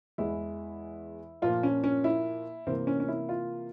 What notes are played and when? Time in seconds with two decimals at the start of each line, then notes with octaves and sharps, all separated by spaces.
0.18 E2 E3 G#3 E4
1.42 A#2 F3 A#3 F4
1.63 C#4
1.84 C#4
2.04 E4
2.67 C3 E3 A#3 C4
2.87 C#4
3.00 C#4
3.08 E4
3.29 F4